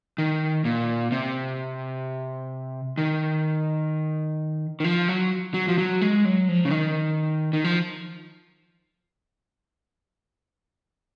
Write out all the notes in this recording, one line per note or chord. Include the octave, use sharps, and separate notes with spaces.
D#3
A#2
C3
D#3
D#3
F3
F#3
F#3
F3
F#3
G#3
F#3
F3
C#3
D#3
D#3
F3